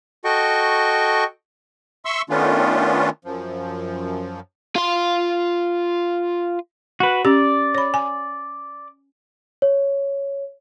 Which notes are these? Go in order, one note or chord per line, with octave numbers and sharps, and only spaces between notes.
F#4 A4 D#5 G5 C#6
E5 C6 C#6 E6
D#3 A3 B3 C#4 D4 F4
F#2 F3
F4 C6
F#4 B4
C#4 G4 D5
C#5 B5
G#5
C#5